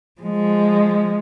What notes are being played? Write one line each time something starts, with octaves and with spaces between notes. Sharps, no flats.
F3 G#3